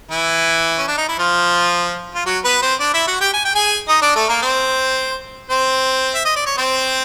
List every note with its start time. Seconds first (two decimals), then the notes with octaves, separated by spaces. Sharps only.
0.11 E3 E4
0.78 C#4
0.87 D4
0.97 D#4
1.09 E4
1.19 F3 F4
2.15 F4
2.26 F#3 F#4
2.44 B3 B4
2.62 C4 C5
2.80 D4 D5
2.93 E4 E5
3.07 F#4 F#5
3.20 G4 G5
3.34 G#5
3.45 G5
3.55 G#4 G#5
3.88 D#4 D#5
4.02 D4 D5
4.15 A3 A4
4.28 A#3 A#4
4.42 C4 C5
5.50 C4 C5
6.14 E5
6.25 D#5
6.36 D5
6.46 C#5
6.58 C4 C5